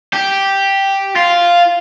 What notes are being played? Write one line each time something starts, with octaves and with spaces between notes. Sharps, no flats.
G4
F4